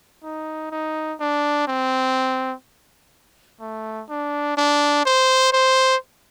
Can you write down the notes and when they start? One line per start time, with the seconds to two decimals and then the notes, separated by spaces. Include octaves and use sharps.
0.23 D#4
0.71 D#4
1.20 D4
1.68 C4
3.60 A3
4.09 D4
4.57 D4
5.05 C5
5.53 C5